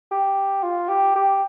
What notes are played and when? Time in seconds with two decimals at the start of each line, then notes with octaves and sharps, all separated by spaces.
0.11 G4
0.63 F4
0.89 G4
1.15 G4